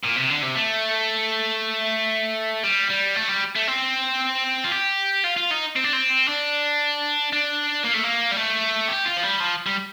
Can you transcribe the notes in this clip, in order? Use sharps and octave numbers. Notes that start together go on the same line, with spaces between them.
A#2
C3
D3
C3
A3
G3
G3
A3
G3
A3
C4
F4
G4
F4
F4
D#4
C4
D4
C4
D4
D4
A#3
A3
A#3
G3
A3
G4
F4
F3
G3
F3
G3